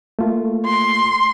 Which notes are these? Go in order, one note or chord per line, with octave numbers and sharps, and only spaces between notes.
A3 A#3 F4
C6